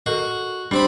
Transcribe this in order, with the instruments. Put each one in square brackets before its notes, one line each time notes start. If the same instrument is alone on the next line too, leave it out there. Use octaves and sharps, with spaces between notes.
[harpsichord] F#4 [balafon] A4 A#4 D#5
[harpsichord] G3 C4 B5 [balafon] D4